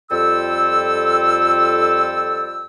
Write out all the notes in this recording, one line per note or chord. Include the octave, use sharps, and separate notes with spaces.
F2 G3 F4 A4 G5 E6